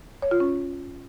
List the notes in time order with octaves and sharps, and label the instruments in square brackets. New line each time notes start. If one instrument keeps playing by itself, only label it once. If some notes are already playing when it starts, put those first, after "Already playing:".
[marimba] C#5
F4
C#4